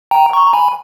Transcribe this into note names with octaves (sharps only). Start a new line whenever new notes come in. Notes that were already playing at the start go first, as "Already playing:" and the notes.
G5 A#5
A#5 C#6
A#5
G#5 B5